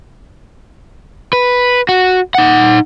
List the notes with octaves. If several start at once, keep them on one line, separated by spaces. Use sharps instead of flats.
B4
F#4
D#4 F#5